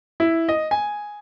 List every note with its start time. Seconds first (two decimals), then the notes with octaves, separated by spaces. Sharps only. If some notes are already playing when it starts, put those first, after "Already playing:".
0.20 E4
0.49 D#5
0.71 G#5